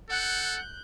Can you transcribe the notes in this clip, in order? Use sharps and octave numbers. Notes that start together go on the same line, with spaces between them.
A4 F#5 F#6 G6